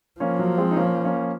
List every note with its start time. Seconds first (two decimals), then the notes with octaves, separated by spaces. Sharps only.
0.20 F3 A#3 C#4
0.39 F#3 A#3
0.58 G#3 C4
0.71 D#4
0.76 A#3 C#4
1.04 A#3 C#4